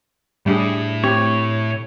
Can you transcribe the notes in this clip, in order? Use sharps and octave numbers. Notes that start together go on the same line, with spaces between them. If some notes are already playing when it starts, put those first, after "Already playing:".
A2 G3 D4 E4 G#4
C4 G4 C#5